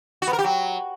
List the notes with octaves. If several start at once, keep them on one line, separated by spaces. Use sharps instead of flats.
F#4
B3
A#4
G4
F#3